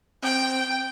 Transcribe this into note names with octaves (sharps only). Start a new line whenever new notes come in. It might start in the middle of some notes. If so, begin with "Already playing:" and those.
C4 G5